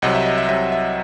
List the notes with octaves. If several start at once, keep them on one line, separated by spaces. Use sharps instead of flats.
C2 C3 F#3 D#5 F#5
E5
D#5
E5
C2 C3 F#3 E5
E5